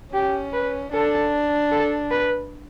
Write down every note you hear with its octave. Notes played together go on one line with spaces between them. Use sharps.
C#4 G4
B4
D4 A4
A4
B4